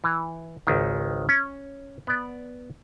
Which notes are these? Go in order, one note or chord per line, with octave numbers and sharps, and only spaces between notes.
E3
G#1 C#2 D#3
C#4
B3 D5